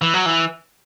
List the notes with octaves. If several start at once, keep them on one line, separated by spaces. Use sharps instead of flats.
E3
F#3
E3